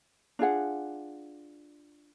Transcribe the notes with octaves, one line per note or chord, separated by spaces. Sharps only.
D4 F4 G#4 F#5